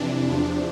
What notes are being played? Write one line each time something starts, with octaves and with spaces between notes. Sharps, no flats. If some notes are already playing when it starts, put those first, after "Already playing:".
Already playing: F2 C3 E3 D4
E2 C3 F3